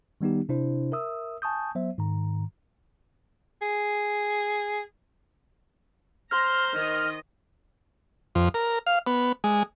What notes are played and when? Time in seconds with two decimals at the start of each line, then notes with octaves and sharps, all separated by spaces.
0.21 D#3 G3 B3 D#4 G4
0.49 C3 D4 E4 C5
0.92 A#4 E5 D#6 E6
1.42 G#5 A5 C#6 D#6 G6
1.75 F#3 B3 C5 E5
1.98 G#2 D#3 A#5
3.62 G#4
6.31 C5 A#5 C6 F6
6.74 D#3 D#5
8.35 F2
8.54 A#4
8.87 F5
9.07 B3
9.44 G#3